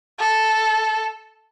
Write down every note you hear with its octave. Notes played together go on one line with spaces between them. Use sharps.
A4